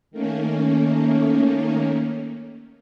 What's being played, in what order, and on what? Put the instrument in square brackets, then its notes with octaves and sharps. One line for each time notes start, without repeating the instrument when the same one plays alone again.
[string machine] D#3 A3 A#3 C#4